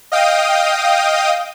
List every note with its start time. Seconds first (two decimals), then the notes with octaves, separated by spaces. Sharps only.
0.12 D#5 F5 G5 D#6